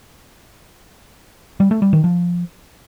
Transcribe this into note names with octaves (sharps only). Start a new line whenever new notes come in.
G3
A3
G3
D#3
F3